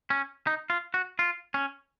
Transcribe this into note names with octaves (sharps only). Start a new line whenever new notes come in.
C#4
D#4
F4
F#4
F4
C#4